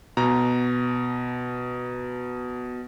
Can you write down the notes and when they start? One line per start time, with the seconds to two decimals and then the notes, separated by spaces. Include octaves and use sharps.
0.17 B2 A#5